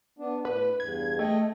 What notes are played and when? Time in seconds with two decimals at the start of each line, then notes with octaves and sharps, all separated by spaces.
0.19 B3 D4
0.45 A2 B4
0.80 E2 G2 G#6
1.19 A3 D#5 G5